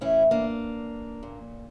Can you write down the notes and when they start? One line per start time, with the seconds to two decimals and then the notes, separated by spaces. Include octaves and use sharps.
0.01 A2 E3 C#4 E4
0.31 A#3 D4
1.23 A#2